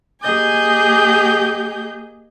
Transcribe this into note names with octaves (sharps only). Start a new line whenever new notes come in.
A#3 G4 G#4 D#5 G#5 G6